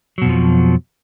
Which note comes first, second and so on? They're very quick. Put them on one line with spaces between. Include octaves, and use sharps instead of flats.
F#3 B2 F2 F3